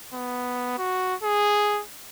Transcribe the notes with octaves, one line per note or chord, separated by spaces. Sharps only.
B3
F#4
G#4